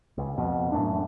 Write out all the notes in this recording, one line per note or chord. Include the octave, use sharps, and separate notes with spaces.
C#2
F2 B2
E1 F#2 A2 D4